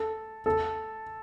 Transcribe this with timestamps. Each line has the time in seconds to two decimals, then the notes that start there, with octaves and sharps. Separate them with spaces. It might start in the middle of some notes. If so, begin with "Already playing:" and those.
Already playing: A4
0.46 A4